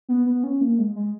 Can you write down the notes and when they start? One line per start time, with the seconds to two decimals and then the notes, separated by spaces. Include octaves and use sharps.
0.09 B3
0.26 B3
0.44 C#4
0.61 A#3
0.78 G#3
0.96 G#3